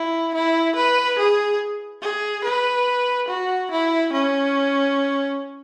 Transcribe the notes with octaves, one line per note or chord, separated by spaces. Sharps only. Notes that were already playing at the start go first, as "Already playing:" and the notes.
Already playing: E4
E4
B4
G#4
G#4
B4
F#4
E4
C#4